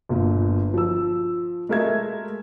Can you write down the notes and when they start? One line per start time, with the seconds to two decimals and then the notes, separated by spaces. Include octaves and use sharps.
0.09 G1 A#2
0.74 F3 E6
1.69 G#3 A3 A#4 E5 G#6